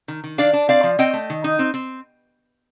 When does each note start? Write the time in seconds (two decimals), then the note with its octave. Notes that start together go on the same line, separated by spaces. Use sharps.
0.08 D#3
0.24 D#3
0.38 D4 D5 F5
0.53 D4
0.69 C4 D5 F5
0.83 F3
0.99 C4 D#5 G5
1.13 A3
1.30 D#3
1.44 D#4
1.59 C4
1.74 C4